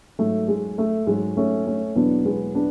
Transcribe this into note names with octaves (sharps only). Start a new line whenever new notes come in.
G#2 F#3 A3
G#3
A3
G#2 F#3 G#3
A3 C#4
A3 C#4
E2 B2 F#3 B3 D4
G#3 B3
B3 D4